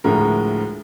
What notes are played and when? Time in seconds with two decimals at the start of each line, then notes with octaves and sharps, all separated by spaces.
0.04 D2 A2 F3 G#3 A#4